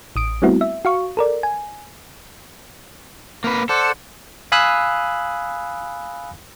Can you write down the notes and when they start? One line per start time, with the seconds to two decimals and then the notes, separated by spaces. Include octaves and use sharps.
0.16 A1 D#6 D7
0.42 G3 A3 B3 C4 E4 F#4
0.61 E5
0.85 F#4 F5 C#6
1.17 A4 A#4 D5
1.43 G#5
3.44 A#3 B4
3.69 A4 C5 D5 F#5
4.52 F5 G#5 B5 D#6 E6 F#6